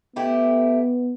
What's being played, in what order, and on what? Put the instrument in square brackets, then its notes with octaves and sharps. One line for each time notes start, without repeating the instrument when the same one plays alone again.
[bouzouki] A3 E4 G4 [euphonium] B3